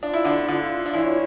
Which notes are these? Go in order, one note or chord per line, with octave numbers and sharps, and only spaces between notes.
D4 F4
E4
D3 D4
D3 D4 F4
D4
E3 E4 C#5